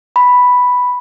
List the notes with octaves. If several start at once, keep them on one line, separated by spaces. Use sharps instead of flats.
B5